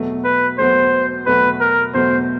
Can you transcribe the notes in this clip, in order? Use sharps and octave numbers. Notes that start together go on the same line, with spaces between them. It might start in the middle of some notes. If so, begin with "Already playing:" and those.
Already playing: E2 B2 F#3 A3
B4
E2 B2 F#3 A3 C5
E2 B2 F#3 A3 B4
A#4
E2 B2 F#3 A3 C5